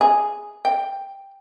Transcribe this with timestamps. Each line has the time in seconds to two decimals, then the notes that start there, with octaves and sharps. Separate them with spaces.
0.01 G#4
0.65 G5